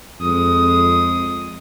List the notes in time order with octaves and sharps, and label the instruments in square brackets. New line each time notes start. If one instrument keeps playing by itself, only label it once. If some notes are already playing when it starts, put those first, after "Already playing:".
[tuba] F2 [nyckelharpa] G#3 D#6